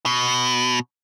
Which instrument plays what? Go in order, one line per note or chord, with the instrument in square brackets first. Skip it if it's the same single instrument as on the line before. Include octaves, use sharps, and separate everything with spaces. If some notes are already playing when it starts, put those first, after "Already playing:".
[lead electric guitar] B2